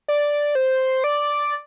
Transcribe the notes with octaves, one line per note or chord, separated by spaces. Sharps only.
D5
C5
D5